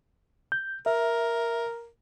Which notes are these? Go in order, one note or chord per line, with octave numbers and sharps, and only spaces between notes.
G6
A#4 E5